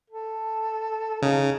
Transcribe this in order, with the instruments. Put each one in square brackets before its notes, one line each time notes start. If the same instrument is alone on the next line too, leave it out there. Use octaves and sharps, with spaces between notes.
[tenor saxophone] A4
[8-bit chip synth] C#3 [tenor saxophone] D#4